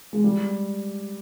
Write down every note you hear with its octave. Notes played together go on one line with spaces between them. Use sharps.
G#3
G3